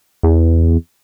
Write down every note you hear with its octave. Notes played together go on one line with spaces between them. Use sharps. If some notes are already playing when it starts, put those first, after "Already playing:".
E2